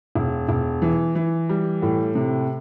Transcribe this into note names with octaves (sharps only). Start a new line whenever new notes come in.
E1
E1
E3
E3
G3
A2
C3